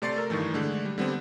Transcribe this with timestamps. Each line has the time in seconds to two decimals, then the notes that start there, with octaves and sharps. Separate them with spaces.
0.02 C3 A3 D5 C6 A6 C7
0.16 A4 A#4
0.30 G2 D#3 E3 A3
0.54 D3 G#3 A3 D4
0.85 G3
0.98 D3 G3 B3 C4